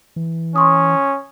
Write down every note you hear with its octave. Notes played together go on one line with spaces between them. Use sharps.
E3
C#4 C6 C#6 D#6